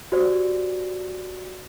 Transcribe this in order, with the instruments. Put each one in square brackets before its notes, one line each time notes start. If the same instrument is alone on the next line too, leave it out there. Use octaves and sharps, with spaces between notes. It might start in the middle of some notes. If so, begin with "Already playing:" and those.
[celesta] F#4 G4 C5 D5